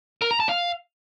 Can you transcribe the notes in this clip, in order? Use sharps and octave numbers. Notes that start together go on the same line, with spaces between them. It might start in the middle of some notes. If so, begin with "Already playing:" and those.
A#4
A#5
A5
F5